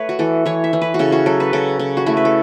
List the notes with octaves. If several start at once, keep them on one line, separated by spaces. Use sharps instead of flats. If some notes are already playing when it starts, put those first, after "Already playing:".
Already playing: A3 B4 C#5
F#4
E3 A4
E3 C#5
E5
E3
B4
F#4
C#3 A4
F#4
F#3 A4
B4
C#3 A4
C#3
F#4
A3 E4
B4
A4